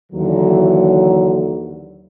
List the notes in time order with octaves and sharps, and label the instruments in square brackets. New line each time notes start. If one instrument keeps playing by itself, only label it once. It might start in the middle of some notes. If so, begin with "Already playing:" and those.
[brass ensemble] D#2 D3 E3 F#3